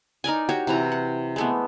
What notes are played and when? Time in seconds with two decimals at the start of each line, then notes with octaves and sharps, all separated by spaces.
0.24 D#4 A#4 D5 G#5
0.49 F#4 G4 C#5
0.67 C3 E3 A#5
0.92 F#5
1.36 G#3 A3 B3